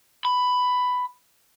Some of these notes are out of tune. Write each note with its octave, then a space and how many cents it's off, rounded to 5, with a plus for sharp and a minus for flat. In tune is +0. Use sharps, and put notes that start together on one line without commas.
B5 +10